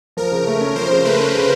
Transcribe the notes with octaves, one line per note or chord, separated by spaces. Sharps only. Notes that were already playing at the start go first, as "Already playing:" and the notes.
F3 A#4
C#3
A3
C#4
F3 C5
C#3
A3 B4
C#4
C#3